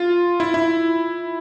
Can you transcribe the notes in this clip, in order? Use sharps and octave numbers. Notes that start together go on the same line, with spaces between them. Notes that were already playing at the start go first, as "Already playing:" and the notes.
Already playing: F4
E4
E4